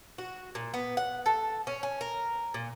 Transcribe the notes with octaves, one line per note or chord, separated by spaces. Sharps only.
F#4
A#2
B3
F#5
A4
C#4
C#4
A#4
A#2